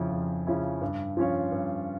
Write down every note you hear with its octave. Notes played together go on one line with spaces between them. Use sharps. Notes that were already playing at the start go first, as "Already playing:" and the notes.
Already playing: F2 C#3 F3 C#4 E4
F2
C#3 F3 C#4 E4
G2
F3 C#4 F4 C#5
G2